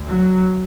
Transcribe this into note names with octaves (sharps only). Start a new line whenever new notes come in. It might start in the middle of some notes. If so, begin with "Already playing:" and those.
Already playing: D2
F#3